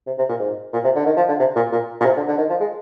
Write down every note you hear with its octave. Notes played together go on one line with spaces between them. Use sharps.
C3
C3
A#2
G#2
A#2
C3
D3
D#3
F3
D3
C3
A#2
A#2
A#2
C3
D3
D3
D#3
F3
G#3